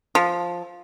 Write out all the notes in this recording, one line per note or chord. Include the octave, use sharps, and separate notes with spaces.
F3